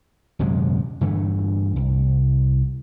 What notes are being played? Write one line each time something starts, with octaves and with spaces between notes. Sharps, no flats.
D#1 F#2 C3 G#3
G2 D3 E3 A3
C2